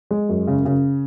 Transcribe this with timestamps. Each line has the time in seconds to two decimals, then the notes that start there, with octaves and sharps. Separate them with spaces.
0.11 G#3
0.29 F#2
0.47 C#3
0.65 C#3